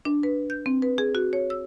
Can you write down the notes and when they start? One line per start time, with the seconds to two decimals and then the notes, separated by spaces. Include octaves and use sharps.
0.05 D4
0.23 B4
0.50 G6
0.66 C4
0.82 B4
0.98 G#4
1.15 F#4
1.33 C#5
1.50 E6